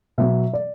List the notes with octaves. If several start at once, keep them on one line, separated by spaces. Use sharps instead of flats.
B2 F#3 E5
D5